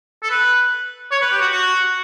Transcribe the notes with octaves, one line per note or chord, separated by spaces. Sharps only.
A4
B4
C#5
B4
G4
F#4
F#4